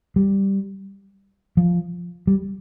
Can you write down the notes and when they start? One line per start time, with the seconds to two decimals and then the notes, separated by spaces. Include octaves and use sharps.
0.16 G3
1.57 F3
2.27 G3